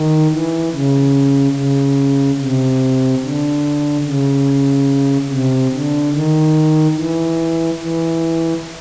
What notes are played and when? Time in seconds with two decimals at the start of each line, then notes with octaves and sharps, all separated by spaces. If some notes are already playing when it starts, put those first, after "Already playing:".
Already playing: D#3
0.31 E3
0.73 C#3
1.56 C#3
2.40 C3
3.23 D3
4.05 C#3
5.30 C3
5.71 D3
6.13 D#3
6.96 E3
7.79 E3